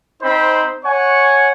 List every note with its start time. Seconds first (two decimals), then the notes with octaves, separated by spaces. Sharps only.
0.22 C4 D#4 C5 B5
0.82 C#5 F#5 G#5 C#6